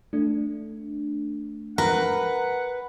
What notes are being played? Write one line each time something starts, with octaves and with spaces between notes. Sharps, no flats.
A3 D4
A#4 B4 F#5